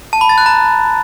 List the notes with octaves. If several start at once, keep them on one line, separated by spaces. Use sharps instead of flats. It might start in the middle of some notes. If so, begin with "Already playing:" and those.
A5
B5
A6
F#6
A#5